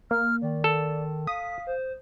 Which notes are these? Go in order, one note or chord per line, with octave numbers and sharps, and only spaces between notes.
A#3 F6
D#3 D5
A4
F5 D#6 B6
C5